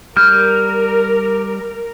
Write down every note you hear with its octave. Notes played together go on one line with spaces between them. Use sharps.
G3 A#4 F6 G6